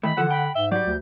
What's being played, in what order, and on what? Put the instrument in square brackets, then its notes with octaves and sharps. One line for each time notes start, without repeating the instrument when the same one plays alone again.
[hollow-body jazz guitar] D#3 E3 A3 [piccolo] B5
[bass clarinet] D3 [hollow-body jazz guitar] E3 F3 A4 [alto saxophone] F#5
[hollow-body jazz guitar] G5 [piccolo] B5
[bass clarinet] G#2 [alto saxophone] E5 [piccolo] G7
[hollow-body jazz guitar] F#3 G3 [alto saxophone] D5 [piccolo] G6
[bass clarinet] D2